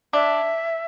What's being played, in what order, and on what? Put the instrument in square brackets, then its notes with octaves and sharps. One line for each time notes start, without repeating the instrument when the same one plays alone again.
[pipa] D4 [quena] E5